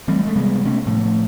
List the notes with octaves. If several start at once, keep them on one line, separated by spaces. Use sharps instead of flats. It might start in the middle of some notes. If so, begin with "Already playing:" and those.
E3 G3 A3 C4
G#3 A3
C3 G3 G#3 B3
C3 A3 B3 C#4
A2 F3 A3